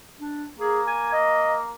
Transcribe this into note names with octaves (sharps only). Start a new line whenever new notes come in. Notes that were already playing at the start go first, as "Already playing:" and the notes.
D4
A#3 G#4
G#5
D#5